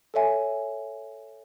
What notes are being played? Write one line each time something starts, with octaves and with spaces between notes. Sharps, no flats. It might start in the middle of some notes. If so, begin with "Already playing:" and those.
A4 C#5 E5 G#5